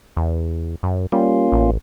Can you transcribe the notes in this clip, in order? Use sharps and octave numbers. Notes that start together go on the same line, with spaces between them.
E2
F#2
G3 A#3 C#4 F4
A1